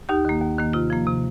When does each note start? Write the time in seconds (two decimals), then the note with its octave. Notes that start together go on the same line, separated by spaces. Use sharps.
0.09 D#2 D#4 G4
0.25 D#3 A#3
0.42 D#2
0.58 D#3 A#3
0.73 C3 F4
0.90 F3 A#3
1.07 C3